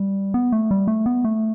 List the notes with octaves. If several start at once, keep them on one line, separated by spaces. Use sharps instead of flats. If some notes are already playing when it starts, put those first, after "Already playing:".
Already playing: G3
B3
A3
G3
A3
B3
A3